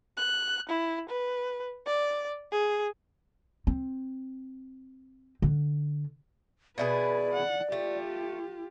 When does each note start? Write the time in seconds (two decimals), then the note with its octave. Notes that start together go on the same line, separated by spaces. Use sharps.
0.17 F#6
0.69 E4
1.09 B4
1.86 D5
2.52 G#4
3.67 C4
5.42 D3
6.78 B2 E4 G#4 B4 D5
7.34 F#5
7.72 A3 F4 G4